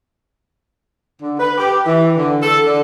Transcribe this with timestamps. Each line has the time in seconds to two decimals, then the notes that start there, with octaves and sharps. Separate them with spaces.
1.21 D3
1.39 B4
1.58 G4
1.86 E3
2.17 D3
2.43 A4
2.66 D3